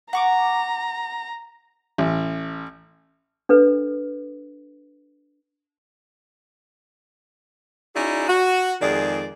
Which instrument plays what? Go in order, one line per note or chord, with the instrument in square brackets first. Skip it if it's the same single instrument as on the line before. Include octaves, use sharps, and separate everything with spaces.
[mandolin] F#5 C#6 D6 [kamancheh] A#5
[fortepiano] A1
[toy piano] D4 A4 B4
[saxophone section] C#4 D#4 E4 F#4 G#4 D5
F#4
F2 D#3 G#3 G#4 D5